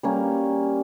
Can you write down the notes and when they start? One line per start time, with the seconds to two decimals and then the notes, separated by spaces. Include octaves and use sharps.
0.03 G3 A#3 C#4